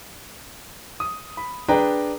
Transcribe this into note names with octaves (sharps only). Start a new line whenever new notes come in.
D#6
B5
D4 G#4 B4 G5 A#5